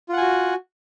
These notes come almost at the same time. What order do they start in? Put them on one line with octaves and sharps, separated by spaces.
F4 F#5 G#5 F#4